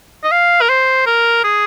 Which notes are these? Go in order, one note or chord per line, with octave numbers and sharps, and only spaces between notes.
D#5
F5
A#4
C5
A#4
G#4